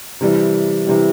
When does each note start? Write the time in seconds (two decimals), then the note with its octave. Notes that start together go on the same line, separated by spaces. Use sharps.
0.21 C3 E3 G3
0.87 C3 E3 G3